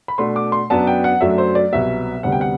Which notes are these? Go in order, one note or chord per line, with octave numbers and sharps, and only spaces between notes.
B5
B2 A3 D4 C6
D6
C6
F#2 F#3 B3 D4 A5
G5
F#5
F#2 F#3 A3 D4 E5
C5
D5
C2 B2 F#3 B3 E5
D2 C3 G3 B3 F#5
G5
F#5